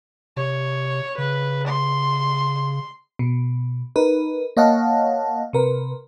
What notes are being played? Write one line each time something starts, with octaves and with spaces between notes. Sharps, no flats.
C3 C#5
C#3 B4
C6
B2
D#4 A#4 B4
A#3 C#5 D#5 F5 F#5 A5
C3 A#4 B4